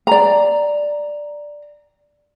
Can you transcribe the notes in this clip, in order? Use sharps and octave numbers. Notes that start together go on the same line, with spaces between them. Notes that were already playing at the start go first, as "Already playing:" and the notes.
D5 A#5